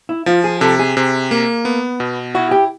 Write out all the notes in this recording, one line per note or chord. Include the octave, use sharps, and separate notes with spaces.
E4
F3 F4
G#4
C3 A4
G#4
C3
A#3
B3
B2
E4 F#4
G4